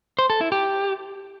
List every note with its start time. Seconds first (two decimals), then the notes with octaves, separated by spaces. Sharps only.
0.19 C5
0.30 A4
0.41 E4
0.52 G4